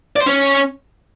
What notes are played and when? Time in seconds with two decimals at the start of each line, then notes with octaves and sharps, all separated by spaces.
0.16 D5
0.21 C5
0.27 C#4